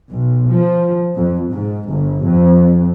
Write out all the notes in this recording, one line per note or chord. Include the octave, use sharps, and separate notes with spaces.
B1
F3
F2
G#2
G1
F2